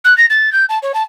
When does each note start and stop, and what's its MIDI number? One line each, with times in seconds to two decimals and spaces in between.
0.04 0.16 90
0.17 0.26 94
0.30 0.52 93
0.52 0.65 91
0.69 0.78 81
0.82 0.92 73
0.94 1.03 81